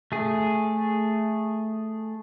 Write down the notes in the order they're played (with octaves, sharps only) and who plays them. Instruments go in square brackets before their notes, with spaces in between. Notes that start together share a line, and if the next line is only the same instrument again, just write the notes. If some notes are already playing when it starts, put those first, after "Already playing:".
[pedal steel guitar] A3 G#4